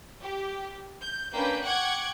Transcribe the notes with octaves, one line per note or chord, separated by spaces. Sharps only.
G4
G6
A#3 C#4 D4 B4 G5 G6
F#5 G5 C#6 D6 F#6 G#6